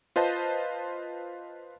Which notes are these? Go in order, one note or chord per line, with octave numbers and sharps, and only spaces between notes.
F4 B4 C5 D#5 A5